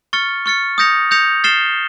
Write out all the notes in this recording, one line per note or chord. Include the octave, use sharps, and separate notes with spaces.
C#6 F6 A6 C#7
C#6 F6 A6 C#7
D#6 G6 A#6 C#7 F7
D#6 G6 A#6 C#7 F7
F6 A6 C7 E7 G7